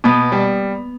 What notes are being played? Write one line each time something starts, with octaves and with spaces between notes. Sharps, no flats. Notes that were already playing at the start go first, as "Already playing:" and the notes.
B2 B3
G3